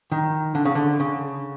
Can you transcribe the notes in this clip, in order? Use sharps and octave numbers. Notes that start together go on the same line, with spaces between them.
D#3
D3
C#3
D3
C#3